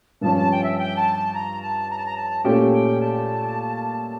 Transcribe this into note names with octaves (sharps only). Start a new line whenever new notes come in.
G2 F3 C#4 A5
A5
G5
E5
G5
A5
A5
A#5
A5
A#5
A5
A#5
A5
A#2 A3 C#4 G4 G5
G5
A5